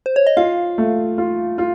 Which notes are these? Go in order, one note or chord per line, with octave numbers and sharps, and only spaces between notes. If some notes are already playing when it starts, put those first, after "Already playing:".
C5
C#5
D#5
F4 F5
A3
F4
F4